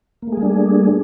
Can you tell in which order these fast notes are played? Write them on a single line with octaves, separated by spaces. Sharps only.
A#3 A3 G#4 G3 D4